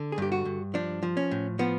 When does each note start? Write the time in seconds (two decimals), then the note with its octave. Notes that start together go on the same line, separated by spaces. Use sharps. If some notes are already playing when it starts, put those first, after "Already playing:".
Already playing: D3
0.12 G#4
0.18 G2 G4
0.32 F#4
0.45 G2
0.74 F3 D4
1.03 F3
1.17 C#4
1.31 A2
1.59 F3 B3